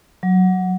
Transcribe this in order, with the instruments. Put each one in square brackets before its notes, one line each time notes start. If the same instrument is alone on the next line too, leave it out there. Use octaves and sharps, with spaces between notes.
[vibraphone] F#3